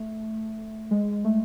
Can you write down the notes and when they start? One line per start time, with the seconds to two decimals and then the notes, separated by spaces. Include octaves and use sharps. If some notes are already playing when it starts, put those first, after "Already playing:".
Already playing: A3
0.91 G#3
1.25 A3